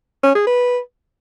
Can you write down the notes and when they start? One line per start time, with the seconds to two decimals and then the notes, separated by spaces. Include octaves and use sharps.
0.23 C#4
0.35 G#4
0.47 B4